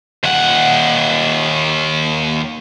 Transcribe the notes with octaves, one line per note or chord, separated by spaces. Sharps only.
D#2 F#5